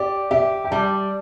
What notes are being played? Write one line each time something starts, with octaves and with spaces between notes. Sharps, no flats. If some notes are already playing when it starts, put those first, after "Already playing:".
Already playing: G4 D5
G4 E5
G5
G3 A5